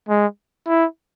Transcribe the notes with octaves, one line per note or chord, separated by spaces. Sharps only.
G#3
E4